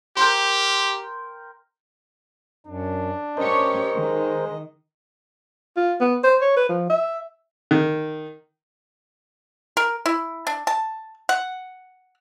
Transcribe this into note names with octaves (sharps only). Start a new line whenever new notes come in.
G4 A#4 G5 C6
F#2 D4
C#4 G4 A#4 C5 C#5 D#5
D#3 G#3
F4
B3
C5
C#5
B4
F3
E5
D#3
A#4
E4
D4
A5
F#5